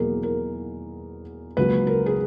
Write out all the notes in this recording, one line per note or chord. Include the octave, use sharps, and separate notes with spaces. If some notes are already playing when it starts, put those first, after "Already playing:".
Already playing: E2 B2 F#3 A#3 G#4 A#4
A#4
C#2 C#3 F#3 A#3 B4
A#4
G#4